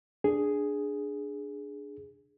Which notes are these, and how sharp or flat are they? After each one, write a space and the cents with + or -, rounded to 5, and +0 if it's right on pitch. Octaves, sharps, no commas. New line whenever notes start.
D4 +0 G#4 +0